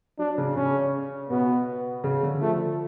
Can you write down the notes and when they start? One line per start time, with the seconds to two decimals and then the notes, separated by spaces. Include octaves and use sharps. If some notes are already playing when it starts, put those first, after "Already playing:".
0.18 F#3 D4
0.38 C#3
0.55 C#3 C#4
1.29 B2 B3
2.04 C#3
2.23 D3
2.41 F3 A3